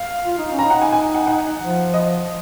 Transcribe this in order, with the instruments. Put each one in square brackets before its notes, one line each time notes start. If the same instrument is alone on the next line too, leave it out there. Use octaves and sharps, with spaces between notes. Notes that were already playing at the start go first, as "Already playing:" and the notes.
Already playing: [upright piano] F5
[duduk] F4
D#4
C#4
[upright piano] A#5
[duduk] D#4
[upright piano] F#5
G#5
G#5
F#5
F#5
[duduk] F3
[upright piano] D#5